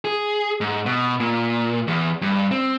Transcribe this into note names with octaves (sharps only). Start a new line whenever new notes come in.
G#4
G#2
B2
A#2
E2
G2
C4